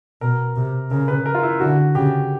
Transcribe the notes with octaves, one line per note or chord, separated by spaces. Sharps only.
B2 A#4
C3
C#3 A#4
B4
A#4
F4
E4
D3 F#4
C#3 G4